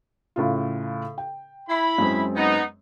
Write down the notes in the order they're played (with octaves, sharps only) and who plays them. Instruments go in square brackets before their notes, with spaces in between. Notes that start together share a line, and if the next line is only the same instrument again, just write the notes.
[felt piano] A2 C#3 F4
G5
[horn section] E4 B5
[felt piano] F#2 G#3 C4
[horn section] B3 D#4